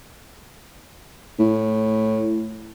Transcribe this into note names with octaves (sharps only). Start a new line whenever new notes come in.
A2